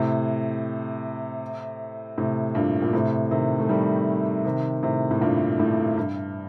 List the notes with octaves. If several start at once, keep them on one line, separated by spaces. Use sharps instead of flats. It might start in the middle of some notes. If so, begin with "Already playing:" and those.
Already playing: A2 C3
A2 C3
G2 A#2
A#2
A2 C3
C3 D#3
A3
D#3 G3
C3 D#3
A2 C3
A2
G2 A#2
A2
G2